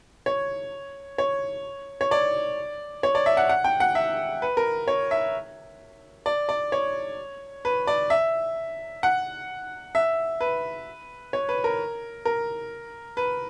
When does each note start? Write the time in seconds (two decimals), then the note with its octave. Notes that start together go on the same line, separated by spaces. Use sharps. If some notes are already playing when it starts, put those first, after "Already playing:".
0.26 C#5
1.18 C#5
2.01 C#5
2.11 D5
3.03 C#5
3.15 D5
3.26 E5
3.37 F#5
3.49 F#5
3.64 G5
3.80 F#5
3.95 E5
4.42 B4
4.57 A#4
4.88 C#5
5.11 E5
6.26 D5
6.49 D5
6.72 C#5
7.65 B4
7.87 D5
8.10 E5
9.03 F#5
9.95 E5
10.41 B4
11.33 C#5
11.49 B4
11.64 A#4
12.25 A#4
13.17 B4